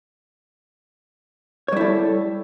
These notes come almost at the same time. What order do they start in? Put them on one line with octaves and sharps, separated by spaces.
C#5 G3 E4 A4